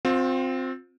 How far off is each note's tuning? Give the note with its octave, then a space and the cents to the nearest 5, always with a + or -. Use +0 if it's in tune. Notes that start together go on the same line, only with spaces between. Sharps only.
C4 +0 F4 +35